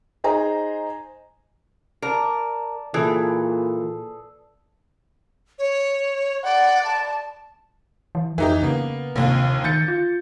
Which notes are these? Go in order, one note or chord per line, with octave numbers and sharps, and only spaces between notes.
D#4 G#4 C5 G#5 A#5
A#4 D5 A5
A#2 E3 G#4 A4
C#5
D5 F#5
A5
E3
F2 E3 D#4 G4
C#3 A#3 B3
A#1 D#2 C3
D#3 G6 A6 C#7
F4